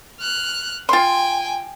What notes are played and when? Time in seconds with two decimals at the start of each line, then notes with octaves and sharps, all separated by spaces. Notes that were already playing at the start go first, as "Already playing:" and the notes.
0.21 F6 F#6
0.89 F4 G5 G#5 C6